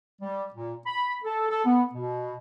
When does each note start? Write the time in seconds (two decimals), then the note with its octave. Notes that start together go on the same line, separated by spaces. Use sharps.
0.22 G3
0.53 A#2
0.85 B5
1.24 A4
1.49 A4
1.65 B3
1.94 B2